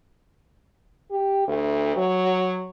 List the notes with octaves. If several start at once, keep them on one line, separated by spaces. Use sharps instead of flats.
G4
D2
F#3